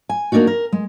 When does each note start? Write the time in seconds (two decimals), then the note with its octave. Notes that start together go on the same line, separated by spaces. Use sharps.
0.09 G#5
0.32 A#3 C4 D4 D#4 F#4
0.47 A#4
0.73 G#3